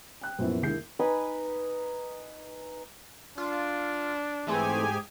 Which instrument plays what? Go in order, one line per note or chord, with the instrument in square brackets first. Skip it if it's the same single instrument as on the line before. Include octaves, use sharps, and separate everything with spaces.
[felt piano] G5 F#6
F#2 A#2 F3 B3 E4
D#2 D3 G#3 E4 G6 C7
[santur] D#4 B4 G#5 B5
[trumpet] D4 [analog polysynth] F4
[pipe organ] G#2 G4 G#5 [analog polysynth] E3 A3 C4 [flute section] G#4